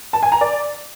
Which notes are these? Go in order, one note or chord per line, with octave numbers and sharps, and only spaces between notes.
A5
G#5
A#5
D5